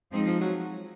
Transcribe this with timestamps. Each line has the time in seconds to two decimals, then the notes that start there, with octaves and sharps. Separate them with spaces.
0.10 F3 G#3 C4 D#4
0.26 F3
0.41 F#3